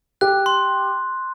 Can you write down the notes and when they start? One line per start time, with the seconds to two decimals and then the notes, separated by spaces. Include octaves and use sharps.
0.21 G4 F#6
0.46 C6